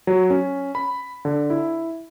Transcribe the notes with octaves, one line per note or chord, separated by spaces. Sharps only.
F#3
C#4
B5
D3
E4